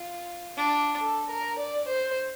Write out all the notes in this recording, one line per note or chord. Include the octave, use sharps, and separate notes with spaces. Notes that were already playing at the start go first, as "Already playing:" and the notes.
Already playing: F4
D4
A4
A#4
D5
C5